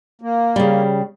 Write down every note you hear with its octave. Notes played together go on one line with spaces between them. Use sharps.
A#3
C#3 G3